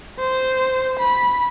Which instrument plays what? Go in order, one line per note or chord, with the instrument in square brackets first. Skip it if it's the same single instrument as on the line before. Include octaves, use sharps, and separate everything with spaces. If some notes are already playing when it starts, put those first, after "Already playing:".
[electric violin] C5
B5